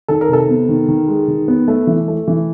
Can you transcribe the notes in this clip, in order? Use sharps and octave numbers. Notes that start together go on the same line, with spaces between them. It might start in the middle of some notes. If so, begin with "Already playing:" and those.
D#3 A4
A#4
C3 A4
B3
D#3
D#3
G#3
D#3
B3
A3
E3
A3
E3